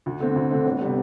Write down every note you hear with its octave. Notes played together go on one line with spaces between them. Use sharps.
D2
D3 A3 C4
D2
D3 A3 C4
G1
C3 G3 B3